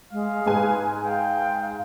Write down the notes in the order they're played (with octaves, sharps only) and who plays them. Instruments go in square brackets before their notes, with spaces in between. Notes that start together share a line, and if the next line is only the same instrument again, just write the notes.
[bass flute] G#3 [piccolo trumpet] F5
[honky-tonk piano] G#2 G#3 G#5 [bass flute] B4
[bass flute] F5 [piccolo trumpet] G5